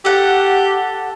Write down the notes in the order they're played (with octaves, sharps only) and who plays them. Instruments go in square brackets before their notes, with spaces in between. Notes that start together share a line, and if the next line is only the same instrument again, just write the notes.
[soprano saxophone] G4 [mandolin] A4 F#5